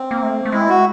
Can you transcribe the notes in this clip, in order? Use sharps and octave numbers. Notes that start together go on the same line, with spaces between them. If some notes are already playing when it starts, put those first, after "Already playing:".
Already playing: C4
A#3
A3
A3
G#3 E4
F#4